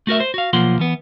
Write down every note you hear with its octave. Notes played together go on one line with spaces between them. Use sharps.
A3 F#4 A#4 E5
C5
F#4 F5
B1 F3 A#3 F4 F#5 C6
E3 B3